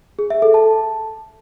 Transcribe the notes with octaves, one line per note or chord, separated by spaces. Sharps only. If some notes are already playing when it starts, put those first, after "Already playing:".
G#4
E5
A4
A5